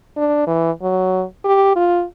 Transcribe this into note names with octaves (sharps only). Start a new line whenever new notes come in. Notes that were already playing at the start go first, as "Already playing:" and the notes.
D4
E3
F#3
G4
F4